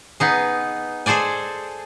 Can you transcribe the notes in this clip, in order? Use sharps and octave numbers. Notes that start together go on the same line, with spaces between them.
B3 D#4 G#4
G#4 A4 C5 D5 G#5